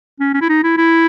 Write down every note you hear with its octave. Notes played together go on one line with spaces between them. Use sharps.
C#4
C#4
E4
D#4
E4
E4